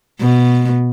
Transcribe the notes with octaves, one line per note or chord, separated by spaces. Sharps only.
B2